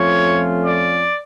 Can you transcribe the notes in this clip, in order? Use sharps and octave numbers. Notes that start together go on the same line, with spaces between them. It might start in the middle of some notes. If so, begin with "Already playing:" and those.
Already playing: F2 F3 A3 C#4 F4 C#5
D5